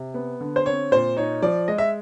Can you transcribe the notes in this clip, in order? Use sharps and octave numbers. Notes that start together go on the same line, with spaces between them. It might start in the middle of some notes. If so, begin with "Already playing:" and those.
Already playing: C3
B3
D3
C5
C4 C#5
A#2 C5
D#4 C#5
F3 D5
G#3 D#5
E5